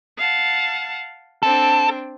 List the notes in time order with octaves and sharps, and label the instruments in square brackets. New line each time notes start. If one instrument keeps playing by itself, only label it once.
[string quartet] F5 F#5 A5
[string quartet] C4 D4 [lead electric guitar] A4